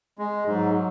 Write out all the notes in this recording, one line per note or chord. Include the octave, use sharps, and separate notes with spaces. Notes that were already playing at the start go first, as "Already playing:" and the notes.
G#3
G#2 F#3